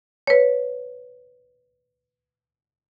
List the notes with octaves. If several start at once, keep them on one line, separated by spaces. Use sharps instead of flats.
B4 C#5